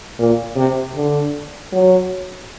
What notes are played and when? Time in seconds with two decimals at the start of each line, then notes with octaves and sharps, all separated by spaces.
0.19 A#2
0.56 C3
0.95 D3
1.72 F#3